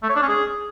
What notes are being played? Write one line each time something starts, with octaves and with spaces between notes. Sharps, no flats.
A3
C#5
D4
C#4
G#4